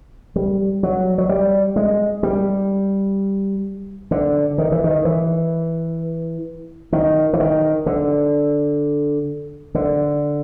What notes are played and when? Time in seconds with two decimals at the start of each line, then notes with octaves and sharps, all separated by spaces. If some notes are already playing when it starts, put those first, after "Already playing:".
0.36 G3
0.83 F#3
1.18 F#3
1.29 G3
1.76 G#3
2.23 G3
4.11 D3
4.58 D#3
4.72 E3
4.84 D#3
5.05 E3
6.93 D#3
7.33 E3
7.40 D#3
7.86 D3
9.75 D3